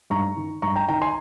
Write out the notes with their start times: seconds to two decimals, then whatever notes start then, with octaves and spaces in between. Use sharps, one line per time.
0.10 G2 A#5 C#6
0.36 D#3
0.62 G2 A#5 C#6
0.75 G5 A#5
0.88 D#3 G5 A#5
1.02 G#5 C6